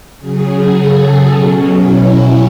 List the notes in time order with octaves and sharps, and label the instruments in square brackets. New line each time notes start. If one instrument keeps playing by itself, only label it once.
[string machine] C#3 F#3 G#4
A4
B2 F#3 C#4
E4